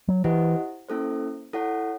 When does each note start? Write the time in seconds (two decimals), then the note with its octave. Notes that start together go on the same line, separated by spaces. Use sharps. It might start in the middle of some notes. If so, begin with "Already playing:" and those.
0.08 F#3
0.24 E3 E4 G4 C5 D#5 F#5
0.88 A#3 C#4 E4 A4 C5
1.53 E4 A4 C#5 F#5